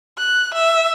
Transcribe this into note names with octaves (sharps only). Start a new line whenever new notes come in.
F#6
E5